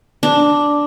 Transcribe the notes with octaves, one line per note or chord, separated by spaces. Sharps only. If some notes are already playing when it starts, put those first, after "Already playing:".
D4